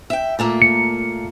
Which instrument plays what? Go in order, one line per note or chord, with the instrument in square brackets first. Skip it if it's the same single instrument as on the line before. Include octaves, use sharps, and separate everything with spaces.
[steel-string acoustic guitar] E5 G5
A#2 A3 A#3
[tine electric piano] C#7